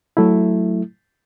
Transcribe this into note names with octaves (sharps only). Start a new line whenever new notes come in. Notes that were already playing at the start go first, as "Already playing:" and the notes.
F#3 A3 E4